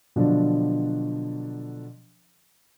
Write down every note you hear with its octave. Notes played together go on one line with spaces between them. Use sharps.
B2 D3 F3 F#3 D4